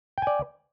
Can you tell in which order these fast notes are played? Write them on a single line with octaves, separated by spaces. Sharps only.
G5 G#5 D5